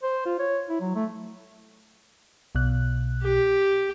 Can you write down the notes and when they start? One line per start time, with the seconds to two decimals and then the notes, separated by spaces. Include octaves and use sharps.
0.03 C5
0.26 F4
0.39 C#5
0.69 E4
0.81 F#3
0.96 A3
2.55 B1 B2 F#6
3.22 G4